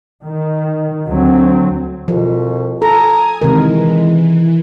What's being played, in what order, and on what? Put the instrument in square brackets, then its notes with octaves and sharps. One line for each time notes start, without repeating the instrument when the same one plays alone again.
[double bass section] D#3
D2 F#3 C4
[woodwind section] C2 F2 B2 [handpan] F3
[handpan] A4 [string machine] G#5 D#6 [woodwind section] A#5
[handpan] C3 D#3 A#4 [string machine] E3 [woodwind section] G#3